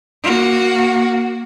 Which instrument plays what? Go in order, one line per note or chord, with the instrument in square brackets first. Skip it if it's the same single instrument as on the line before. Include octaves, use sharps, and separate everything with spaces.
[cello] A#3 F#4